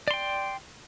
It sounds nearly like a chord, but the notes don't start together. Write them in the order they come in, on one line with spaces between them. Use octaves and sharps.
D5 C6 G5